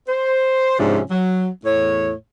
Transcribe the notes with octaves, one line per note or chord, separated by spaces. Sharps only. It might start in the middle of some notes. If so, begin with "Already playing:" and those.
C5
G#2 C3 F3 C#4 D4
F#3
E2 A2 C#5